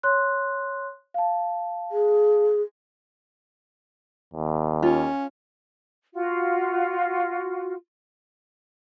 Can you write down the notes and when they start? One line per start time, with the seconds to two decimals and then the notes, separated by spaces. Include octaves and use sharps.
0.03 C#5 C6 F#6
1.14 F5 A5
1.91 G#4
4.34 D#2
4.83 C#4 F4
6.13 F4 F#4